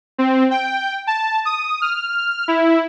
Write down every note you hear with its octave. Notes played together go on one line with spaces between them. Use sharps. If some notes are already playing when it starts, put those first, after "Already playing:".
C4
G5
A5
D#6
F6
E4